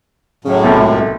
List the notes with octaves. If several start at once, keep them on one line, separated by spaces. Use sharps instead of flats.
F#2 A2 C#3
B1 C3 A3
C#2